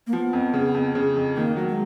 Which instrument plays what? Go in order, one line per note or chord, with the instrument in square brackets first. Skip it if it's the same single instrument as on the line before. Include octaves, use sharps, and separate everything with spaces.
[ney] A#3
[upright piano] F3 [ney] B3
[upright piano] F2
C#3
F2
C#3
F2
[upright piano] D#3 [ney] A#3
[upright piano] F#3 [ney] A#3
[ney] G#3